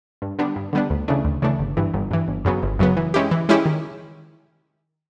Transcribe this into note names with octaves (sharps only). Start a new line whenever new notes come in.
G2
D3 G3 B3 D4
G2
D3 G3 B3 D4
D2
C#3 E3 A3 D4
D2
C#3 E3 A3 D4
G1
G2 E3
G1
G2 E3
G1
F#2 C#3 F#3 B3
G1
F#2 C#3 F#3 B3
E3
G#3 C#4 E4 G4
E3
G#3 C#4 E4 G4
D#3